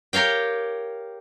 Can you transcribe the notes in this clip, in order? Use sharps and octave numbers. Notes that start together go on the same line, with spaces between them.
G4 A#4 C#5 F5 G5